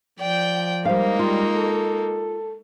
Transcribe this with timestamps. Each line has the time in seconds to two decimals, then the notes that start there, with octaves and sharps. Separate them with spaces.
0.20 F3 D5 G5 G6
0.85 G3 G#3 A#3 D#4 C5 F5
1.19 G3 F4
1.53 A4